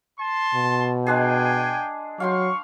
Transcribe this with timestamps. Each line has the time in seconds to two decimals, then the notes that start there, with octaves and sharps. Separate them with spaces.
0.20 A5 C6
0.55 B2
1.07 G#3 D4 G#4 G5 G#5
2.20 F#3 F5 G5 C6 C#6